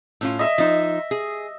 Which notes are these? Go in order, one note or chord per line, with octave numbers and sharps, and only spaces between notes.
A2 C#4 F4
D#5 E5
F3 D#4
G#4